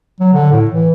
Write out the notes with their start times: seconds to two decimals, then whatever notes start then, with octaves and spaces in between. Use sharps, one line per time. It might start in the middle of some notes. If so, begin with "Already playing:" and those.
0.21 F#3
0.33 D3
0.52 A2
0.71 E3